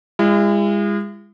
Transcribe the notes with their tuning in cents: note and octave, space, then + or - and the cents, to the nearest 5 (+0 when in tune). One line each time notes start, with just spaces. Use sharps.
G#3 -35 E4 +40